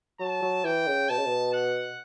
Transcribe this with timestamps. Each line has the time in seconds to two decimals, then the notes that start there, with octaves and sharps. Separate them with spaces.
0.20 F#3 A5
0.42 F#3
0.64 E3 G5
0.88 C#3
1.09 B2 A5
1.18 C#3
1.25 B2
1.54 F#5